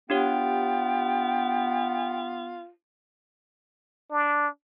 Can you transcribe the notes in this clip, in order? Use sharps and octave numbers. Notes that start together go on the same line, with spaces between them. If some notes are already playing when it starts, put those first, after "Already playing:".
B3 D4 F4 G4 C#5 G5
D4